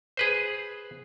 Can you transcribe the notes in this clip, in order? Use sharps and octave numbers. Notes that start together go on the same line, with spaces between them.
G#4 B4 C5